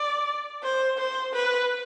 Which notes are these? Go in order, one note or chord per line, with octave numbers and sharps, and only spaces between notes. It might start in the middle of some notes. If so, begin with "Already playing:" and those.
Already playing: D5
C5
C5
B4